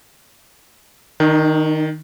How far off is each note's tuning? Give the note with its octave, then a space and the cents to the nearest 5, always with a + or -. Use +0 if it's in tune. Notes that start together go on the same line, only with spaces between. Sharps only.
D#3 +5 D#4 -45